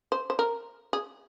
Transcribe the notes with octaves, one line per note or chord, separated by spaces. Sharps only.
C5
C5
A#4
G#4